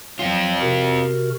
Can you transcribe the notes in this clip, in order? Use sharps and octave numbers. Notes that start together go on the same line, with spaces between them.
F#3 C4 F4
C3 F#4 A#4